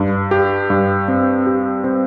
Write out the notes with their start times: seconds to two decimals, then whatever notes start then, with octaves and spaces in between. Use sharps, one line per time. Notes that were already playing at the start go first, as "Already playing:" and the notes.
Already playing: G2
0.31 G4
0.70 G2
1.08 C4
1.47 G4
1.84 C4